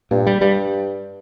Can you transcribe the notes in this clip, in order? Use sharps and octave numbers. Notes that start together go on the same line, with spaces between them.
G2 A#2
G3
G2 G3